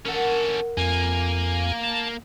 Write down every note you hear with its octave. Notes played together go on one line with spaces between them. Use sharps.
C#4 A4 A#4 F#5
F2 A#3 G#5
A5